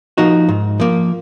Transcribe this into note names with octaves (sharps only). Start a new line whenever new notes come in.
F3 A#3 D#4 F#4
G#2
F3 A#3